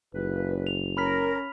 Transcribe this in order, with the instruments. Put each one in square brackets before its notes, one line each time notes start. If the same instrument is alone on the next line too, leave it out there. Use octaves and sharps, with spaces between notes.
[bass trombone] F#1 [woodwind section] C#2 B4
[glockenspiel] F7
[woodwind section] C#4 [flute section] A#4 [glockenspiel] B5 F6 B6